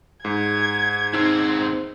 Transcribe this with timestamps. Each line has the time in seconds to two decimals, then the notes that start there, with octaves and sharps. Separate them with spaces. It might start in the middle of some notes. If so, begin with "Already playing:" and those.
0.25 G#2 G#6
1.14 D#2 C4 D#4 E6